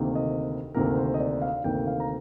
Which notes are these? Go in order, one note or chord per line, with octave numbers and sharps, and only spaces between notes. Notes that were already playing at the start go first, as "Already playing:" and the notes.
Already playing: D2 C3 D#3 A#3
D#5
D2 C3 D#3 A#3 A#4
C5
D#5
D5
F5
D2 C3 D#3 A#3 G5
F5
A#5